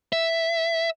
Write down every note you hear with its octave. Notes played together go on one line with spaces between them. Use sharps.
E5